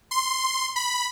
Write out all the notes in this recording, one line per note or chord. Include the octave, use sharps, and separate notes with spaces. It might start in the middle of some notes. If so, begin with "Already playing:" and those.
C6
B5